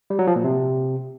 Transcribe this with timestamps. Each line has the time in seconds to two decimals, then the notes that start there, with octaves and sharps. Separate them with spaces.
0.10 G3
0.19 F#3
0.27 F3
0.36 A#2
0.44 C3